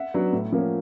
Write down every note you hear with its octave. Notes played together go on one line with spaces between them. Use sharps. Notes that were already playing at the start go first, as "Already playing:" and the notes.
Already playing: E5 F#5
F#3 B3 D4
A2
F3 A#3 C#4